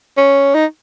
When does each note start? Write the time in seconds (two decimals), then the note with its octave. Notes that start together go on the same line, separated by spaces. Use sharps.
0.17 C#4
0.55 D#4